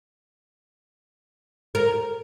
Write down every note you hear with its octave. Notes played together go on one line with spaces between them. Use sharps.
A#4